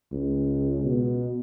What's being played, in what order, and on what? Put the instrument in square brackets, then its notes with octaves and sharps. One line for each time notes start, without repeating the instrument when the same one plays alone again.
[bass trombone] C#2
B2